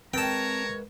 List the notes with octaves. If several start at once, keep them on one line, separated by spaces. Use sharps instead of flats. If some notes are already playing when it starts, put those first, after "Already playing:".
G#3 C4 A#4 B4 C#5 G5 A5 A#5